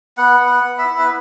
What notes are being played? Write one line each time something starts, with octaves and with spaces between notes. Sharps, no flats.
B3 F#5
B3
F#5
B3
E5
E4
B4